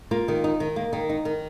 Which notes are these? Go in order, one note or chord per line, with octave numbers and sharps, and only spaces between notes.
A#3 F4
D#3
D#4
D#3
A#3
D#3
D#4
D#3